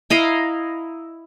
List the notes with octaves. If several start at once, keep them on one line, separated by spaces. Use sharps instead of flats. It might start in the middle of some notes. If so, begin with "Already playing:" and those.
E4 D#5 F5 A#5